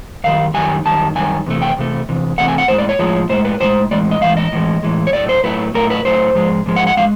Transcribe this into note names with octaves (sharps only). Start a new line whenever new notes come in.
F#2 D#3 G3 F5
F#2 D#3 G3 G#5
F#2 D#3 G3 A5
F#2 D#3 G3 G#5
E2 C3 A3
G5
E2 C3 A3
E2 C3
E2 C3 E3 A3 F#5
G#5
F#5
A2 F3 G#3 C5
D5
C#5
A2 F3 G#3
A2 F3 G#3 C5
B4
A2 F3 G#3 C5
A2 E3 G#3 D5
D#5
A2 E3 G#3 F5
D#5
A2 E3 G#3
A2 E3 G#3
C#5
A2 F#3 A3 D5
C5
A2 F#3 A3 B4
A2 F#3 A3 A#4
B4
A2 F#3 A3 C5
G#2 F3 G#3
G#2 F3 G#3
F#5
F#5
F3 G#3 F5